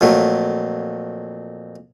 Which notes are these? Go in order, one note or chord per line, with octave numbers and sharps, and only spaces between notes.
F2 A#2 F#3 A3